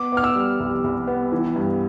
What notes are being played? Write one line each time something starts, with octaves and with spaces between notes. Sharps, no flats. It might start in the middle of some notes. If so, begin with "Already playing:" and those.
Already playing: B3 D6
B3 F6
E6
G3
C2
C2
B3
E3
G2